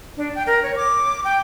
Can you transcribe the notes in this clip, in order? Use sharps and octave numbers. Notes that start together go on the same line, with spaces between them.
D4
G5
A#4
C#5
D6
G5